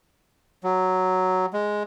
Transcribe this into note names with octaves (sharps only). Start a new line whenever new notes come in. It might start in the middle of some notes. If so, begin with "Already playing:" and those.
F#3
G#3